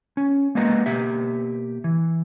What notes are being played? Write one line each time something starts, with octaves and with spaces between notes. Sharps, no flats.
C#4
G#3 A#3 B3 F#4 D#5 A#5
B2 A#3 G4 E5
E3